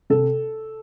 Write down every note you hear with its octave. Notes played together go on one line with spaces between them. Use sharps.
C3 A4